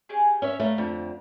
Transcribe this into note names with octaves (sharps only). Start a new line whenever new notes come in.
C#4 G4 G#4
C#4 C#5 E5
A3 B4 F5 A#5
F2 D3